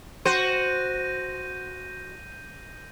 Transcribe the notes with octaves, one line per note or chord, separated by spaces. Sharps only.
F#4 C5 G6 A#6 D#7